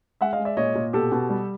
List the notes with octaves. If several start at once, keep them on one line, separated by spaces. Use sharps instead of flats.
G#3 E5 F#5
D#5 F5
G#3
D5 E5
A#2 C#5 D#5
A#2
B2 G4 A4
B2
G3